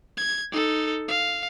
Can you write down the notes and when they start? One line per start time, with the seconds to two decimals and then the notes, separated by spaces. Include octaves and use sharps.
0.17 G#6
0.52 D#4 A4
1.08 F5